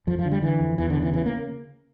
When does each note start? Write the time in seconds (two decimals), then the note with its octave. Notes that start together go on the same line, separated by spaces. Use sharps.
0.07 F2 F3
0.19 F3
0.25 D3
0.32 G3
0.42 D3 E3
0.60 F2
0.78 E2 E3
0.90 D3
0.96 C#3
1.02 E3
1.13 C#3 E3
1.26 A#3